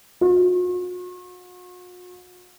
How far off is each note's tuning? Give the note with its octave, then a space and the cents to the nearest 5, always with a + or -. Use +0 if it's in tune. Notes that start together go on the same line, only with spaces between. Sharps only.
F#4 -45